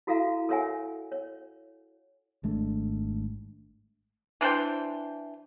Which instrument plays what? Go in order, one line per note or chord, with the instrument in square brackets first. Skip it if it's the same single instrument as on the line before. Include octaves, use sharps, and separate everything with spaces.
[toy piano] E4 F#4 A4 E5 F5 A#5
A4 A#4 C#5 E5 F#5 G#5
C#5
[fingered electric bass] G#1 G#3 A3 D4
[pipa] E3 D4 C5 G5